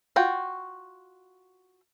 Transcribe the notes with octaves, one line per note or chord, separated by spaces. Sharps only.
F4 F#4 G5